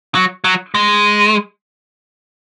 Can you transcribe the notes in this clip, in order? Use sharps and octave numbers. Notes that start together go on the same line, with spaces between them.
F#3
F#3
G#3